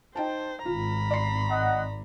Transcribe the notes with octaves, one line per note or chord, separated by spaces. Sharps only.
D#4 C5 G5 A5
G#1 F4 A#5 B5
D5 C6 C7
D#5 F#5